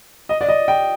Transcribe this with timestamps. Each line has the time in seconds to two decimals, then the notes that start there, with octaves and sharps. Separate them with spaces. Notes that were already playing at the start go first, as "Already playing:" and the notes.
0.29 D#5
0.41 D5
0.48 D#5
0.68 G5